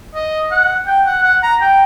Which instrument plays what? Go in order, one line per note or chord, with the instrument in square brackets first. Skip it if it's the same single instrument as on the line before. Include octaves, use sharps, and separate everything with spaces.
[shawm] D#5
F#5
G5
F#5
F#5
A#5
G5